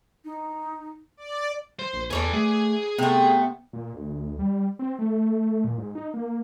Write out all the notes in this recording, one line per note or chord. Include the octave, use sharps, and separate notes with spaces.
D#4
D5
C5
A#1
E2 A4 B4 C#5 D5 G#5
A3 G#4
C3 A3 B3
A#2
D2
G3
C4
A3
A#2
G#2
D#4
A#3